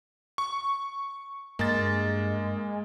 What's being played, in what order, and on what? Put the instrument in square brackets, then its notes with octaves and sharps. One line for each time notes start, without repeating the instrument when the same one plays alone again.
[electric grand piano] C#6
[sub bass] G2 [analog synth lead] G#3 [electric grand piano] A#3 A6